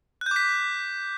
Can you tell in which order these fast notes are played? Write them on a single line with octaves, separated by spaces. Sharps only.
F#6 G6 D6 B6